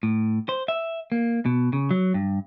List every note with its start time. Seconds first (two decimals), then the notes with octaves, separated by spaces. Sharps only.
0.03 A2
0.49 C5
0.68 E5
1.12 A#3
1.46 B2
1.73 C#3
1.91 F#3
2.14 G2